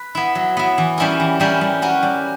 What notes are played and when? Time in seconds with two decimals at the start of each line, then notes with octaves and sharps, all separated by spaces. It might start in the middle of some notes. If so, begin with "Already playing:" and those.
Already playing: B4
0.15 B3 E4
0.35 F#3
0.57 B3 E4
0.78 E3
0.98 G3 C#4 E4 A#4
1.20 E3
1.40 G3 C#4 E4 A#4
1.61 G3
1.82 C#4 F#4 A#4
2.03 G3